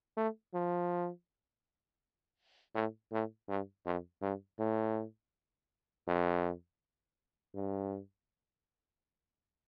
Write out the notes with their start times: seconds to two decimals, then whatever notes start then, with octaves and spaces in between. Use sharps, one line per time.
0.17 A3
0.54 F3
2.74 A2
3.12 A2
3.49 G2
3.86 F2
4.22 G2
4.59 A2
6.07 F2
7.54 G2